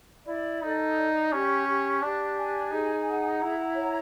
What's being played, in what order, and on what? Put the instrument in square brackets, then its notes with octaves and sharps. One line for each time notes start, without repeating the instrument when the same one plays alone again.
[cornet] E4 [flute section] D5
[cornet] D#4 [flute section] A4
[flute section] D5
[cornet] C#4 [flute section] G4
[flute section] G4
[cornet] D4 [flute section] G4
[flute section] G#5
[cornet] D#4 [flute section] G#4
[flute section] F#5
[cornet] E4 [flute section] A#5
[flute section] C#5